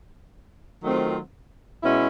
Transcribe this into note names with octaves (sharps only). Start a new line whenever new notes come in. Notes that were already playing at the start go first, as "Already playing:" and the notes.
D#3 F#3 A3 C4 F4
B2 G#3 C#4 E4